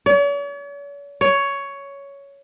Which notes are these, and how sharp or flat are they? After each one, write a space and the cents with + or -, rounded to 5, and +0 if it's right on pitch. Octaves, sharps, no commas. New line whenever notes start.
C#5 +45
C#5 +10